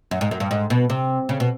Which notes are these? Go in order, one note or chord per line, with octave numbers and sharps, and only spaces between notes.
F#2
G#2
F#2
G2
G#2
B2
C3
C#3
B2